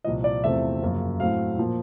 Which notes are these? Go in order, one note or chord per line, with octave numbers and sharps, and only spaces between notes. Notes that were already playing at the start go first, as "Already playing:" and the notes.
C2 A#2 F3 D#5
D5
E2 C3 F3 A3 C4 E5
F#2 C#3 F3 A#3
A2 F#3 A3 C4 F5
A#2 F3 A#3